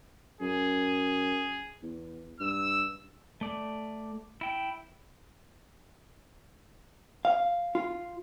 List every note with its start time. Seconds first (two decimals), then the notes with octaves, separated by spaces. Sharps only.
0.41 F#2 G#4
1.83 E2
2.40 G2 E6
3.41 A3 D5
4.41 E4 G5
7.25 F5
7.75 F4